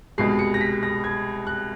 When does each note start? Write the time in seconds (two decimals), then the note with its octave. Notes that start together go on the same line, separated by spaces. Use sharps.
0.18 C2 B2 G#3 C7
0.39 C#7
0.54 A#6
0.61 B6
0.83 A#6
1.04 G#6
1.47 F#6